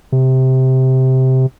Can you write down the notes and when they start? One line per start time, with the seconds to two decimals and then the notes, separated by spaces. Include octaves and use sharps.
0.12 C3